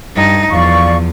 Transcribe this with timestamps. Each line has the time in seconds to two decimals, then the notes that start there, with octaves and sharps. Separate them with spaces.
0.15 G2 D#4
0.51 E2 F3 D5 F5 C#6